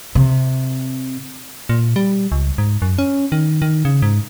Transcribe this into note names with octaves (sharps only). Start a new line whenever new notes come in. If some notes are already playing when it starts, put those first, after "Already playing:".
C3
A#2
G3
C#2
G#2
F#2
C#4
D#3
D#3
C#3
G#2